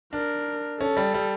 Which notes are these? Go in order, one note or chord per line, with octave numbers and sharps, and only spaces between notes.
D4 A#4
C#4 A4
G3
G3